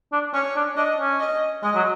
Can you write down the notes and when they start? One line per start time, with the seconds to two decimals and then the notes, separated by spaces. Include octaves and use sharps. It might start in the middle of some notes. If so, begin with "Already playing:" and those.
0.12 D4
0.34 C#4 C#5
0.56 D4
0.77 D4 D#5
0.98 C#4
1.20 D#5
1.63 G#3 D#5
1.75 F#3